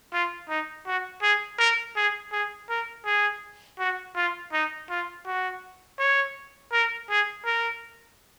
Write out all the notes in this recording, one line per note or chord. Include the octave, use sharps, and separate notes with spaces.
F4
D#4
F#4
G#4
A#4
G#4
G#4
A#4
G#4
F#4
F4
D#4
F4
F#4
C#5
A#4
G#4
A#4